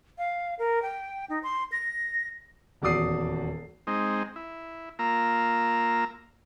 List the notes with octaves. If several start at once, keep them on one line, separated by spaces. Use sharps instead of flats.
F5
A#4
G5
D#4
C6
A#6
D#1 E2 F#4 D5 D#6 C7
G#3 C4 D#4
E4
A#3 F4 A#5 E6